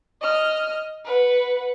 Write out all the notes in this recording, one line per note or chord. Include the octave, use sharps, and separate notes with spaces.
D#5 F6
B4 F#5